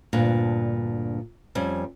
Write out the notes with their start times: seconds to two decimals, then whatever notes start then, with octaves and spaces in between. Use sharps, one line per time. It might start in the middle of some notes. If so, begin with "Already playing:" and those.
0.13 D2 G2 A#2 D4
1.55 F2 G3 C#4